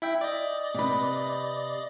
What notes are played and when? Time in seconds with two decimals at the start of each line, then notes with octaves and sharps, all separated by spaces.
0.02 E4 E5 G5
0.21 D5 D#5
0.74 C3 B4